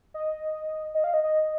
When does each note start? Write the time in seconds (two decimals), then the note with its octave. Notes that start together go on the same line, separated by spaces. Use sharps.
0.14 D#5
0.95 D#5
1.04 F5
1.14 D#5
1.24 D#5